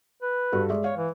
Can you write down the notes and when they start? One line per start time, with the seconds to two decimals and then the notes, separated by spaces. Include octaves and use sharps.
0.22 B4
0.52 G2 F#4 A4
0.70 G#3 D5 E5
0.84 C#5 F5
0.97 E3